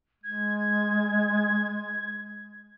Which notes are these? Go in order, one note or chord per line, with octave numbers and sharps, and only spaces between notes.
G#3 G#6